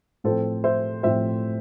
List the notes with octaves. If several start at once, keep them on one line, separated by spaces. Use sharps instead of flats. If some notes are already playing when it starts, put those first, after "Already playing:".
A2 F3 C4 A4 C5
C5 E5
A2 F3 C4 C5 E5